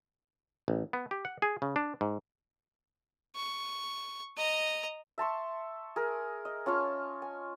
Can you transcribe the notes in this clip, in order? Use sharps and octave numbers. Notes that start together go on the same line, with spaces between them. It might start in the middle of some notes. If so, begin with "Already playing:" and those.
A1
B3
G4
F#5
G#4
C#3
D4
G#2
C#6
D#5 A#5
E5 A5 C6 C#6
G#4 A#4
D#5
C#4 F4 A5 C#6
G#5